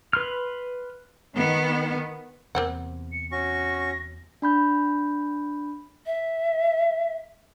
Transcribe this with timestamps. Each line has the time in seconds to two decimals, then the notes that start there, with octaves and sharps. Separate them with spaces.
0.13 B4 C6 F6
1.37 D#3 B3
2.55 E2 C3 A#3 C4 F#5
3.12 C#7
3.32 C#4 F#4 C#6 A#6
4.42 D4 B5 G6
6.06 E5